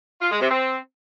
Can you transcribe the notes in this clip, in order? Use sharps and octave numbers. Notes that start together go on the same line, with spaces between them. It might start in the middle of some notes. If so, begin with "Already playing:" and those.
F4
G#3
C3
C4